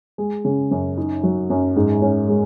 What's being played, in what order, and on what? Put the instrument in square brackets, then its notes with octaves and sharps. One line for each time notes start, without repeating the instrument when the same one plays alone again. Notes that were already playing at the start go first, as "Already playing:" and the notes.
[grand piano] G#3
C#3
F#2
D#4
F#3
F#2
G#2
C#4
G#3